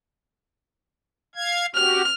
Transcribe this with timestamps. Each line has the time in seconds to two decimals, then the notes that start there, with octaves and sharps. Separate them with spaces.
1.35 F5 G#6
1.75 F#4 G4 F6